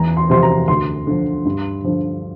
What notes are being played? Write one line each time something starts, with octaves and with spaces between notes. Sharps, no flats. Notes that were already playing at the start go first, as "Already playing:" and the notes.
Already playing: E2 A#5
C6
C3 F3 C6
A#5
D2 C6
D3 F3
G2
D3 F3